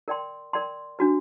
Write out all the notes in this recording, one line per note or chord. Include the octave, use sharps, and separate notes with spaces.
A#4 D5 G5 C6
A#4 D5 G5 C6
D4 F#4 B4